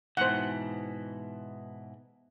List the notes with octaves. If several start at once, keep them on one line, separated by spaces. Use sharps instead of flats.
G#2 B2 E3 C5 F#5